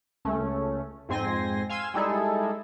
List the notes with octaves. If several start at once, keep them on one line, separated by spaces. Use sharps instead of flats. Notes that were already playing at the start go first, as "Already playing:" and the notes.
C#2 A3 C#4
F2 G#2 C4 G#5 C6 A#6
F5 G#5 C6 E6 G#6 E7
G3 G#3 D#4 E4 G#4 A4